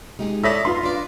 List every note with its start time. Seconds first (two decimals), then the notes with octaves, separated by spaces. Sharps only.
0.19 G#3 D#4 G4 G#4
0.43 A4 C#5 D5 E5 D#6 A#6 B6
0.65 B3 F4 F5 C6
0.83 D4 B4 D5